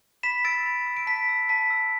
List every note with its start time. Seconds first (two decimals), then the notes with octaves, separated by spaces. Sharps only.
0.23 B5 B6 E7
0.45 E6 A6 D7
0.66 B5
0.86 E6
0.97 D7
1.07 A5 B6
1.29 E6
1.49 A5 B6
1.70 E6